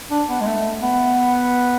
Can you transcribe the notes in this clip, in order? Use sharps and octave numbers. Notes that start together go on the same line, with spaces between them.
D4
B3
G#3
A3
B3